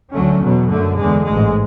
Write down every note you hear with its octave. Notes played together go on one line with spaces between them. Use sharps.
D2 D3 F#3 A3 C#4
E2 B2 F#3
F#2 D3 A3
E2 D3 G#3
A1 G#2 G#3